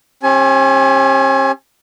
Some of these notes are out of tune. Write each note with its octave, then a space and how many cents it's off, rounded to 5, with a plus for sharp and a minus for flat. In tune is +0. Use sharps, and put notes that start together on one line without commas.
C#4 -45 G4 +10 G#5 +25